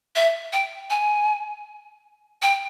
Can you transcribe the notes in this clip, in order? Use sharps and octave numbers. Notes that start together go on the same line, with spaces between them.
E5
G5
G#5
G5